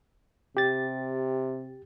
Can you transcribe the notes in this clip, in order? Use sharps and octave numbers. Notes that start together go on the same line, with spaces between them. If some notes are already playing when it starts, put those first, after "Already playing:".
C3 G4 A6